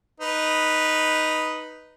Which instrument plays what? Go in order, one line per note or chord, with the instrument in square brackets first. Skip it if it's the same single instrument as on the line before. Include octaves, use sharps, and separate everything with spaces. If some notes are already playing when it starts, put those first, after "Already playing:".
[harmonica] D#4 B4